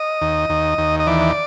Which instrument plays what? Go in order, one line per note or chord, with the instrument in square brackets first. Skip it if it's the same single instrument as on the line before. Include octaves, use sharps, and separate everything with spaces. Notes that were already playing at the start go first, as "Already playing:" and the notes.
Already playing: [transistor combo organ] D#5
D#2
D#2
D#2
D#5
E3 D5